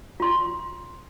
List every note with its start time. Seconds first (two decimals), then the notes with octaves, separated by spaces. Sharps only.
0.20 F4 C6